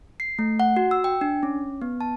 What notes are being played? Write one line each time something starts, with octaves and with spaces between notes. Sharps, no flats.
C7
A3
F#5
F#4
E6
G5
D4
C#4
B3
A5